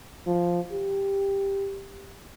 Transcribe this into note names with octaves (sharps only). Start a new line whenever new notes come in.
F3
G4